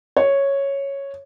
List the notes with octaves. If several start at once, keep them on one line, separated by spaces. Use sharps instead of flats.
C#5